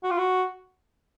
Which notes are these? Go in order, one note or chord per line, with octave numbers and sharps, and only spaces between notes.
F#4
F4
F#4